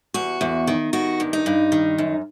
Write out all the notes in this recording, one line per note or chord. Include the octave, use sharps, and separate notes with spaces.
E2 F#4
E2
D#3
D#3 F#4
G2
D#4
G2
D#3
F#2